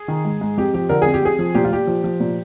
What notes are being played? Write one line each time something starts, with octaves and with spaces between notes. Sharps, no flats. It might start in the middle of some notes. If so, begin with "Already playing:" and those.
Already playing: G#4
D#3
G#2
G#2
F2 G4
F3 G4
D3 A#4
F2 G#4
G4
F2 G#4
F3
A#2 G4
F4
A#2 G4
F3
F3
A#2